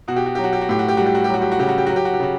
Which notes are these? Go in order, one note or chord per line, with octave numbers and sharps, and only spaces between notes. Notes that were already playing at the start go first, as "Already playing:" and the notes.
B2 F#4
G4
F#4
F#3 G4
F#4
G4
F#4
A2 G4
F#4
G4
G3 F#4
G4
F#4
G4
F#3
F#4
G4
F#4
C#3 G4
F#4
G4
F#3 F#4
G4
F#4
G4
C#3 F#4